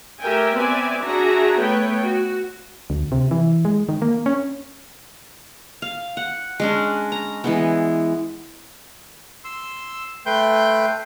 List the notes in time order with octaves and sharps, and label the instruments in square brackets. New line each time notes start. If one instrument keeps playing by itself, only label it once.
[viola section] A3 G4 A#4 E5 G5 G#5
B3 C4 B4 D5 E5 G#5
D4 F#4 G#4 E5 A#5
A3 B3 B4 C#5 G5
F#4
[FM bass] D2
C3
E3
G#3
D#3
A#3
C#4
[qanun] F5
F#5
G#3 C#4 D4
A#5
E3 G#3 B3
[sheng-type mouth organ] C6 E6
A3 B4 G5 C6 G6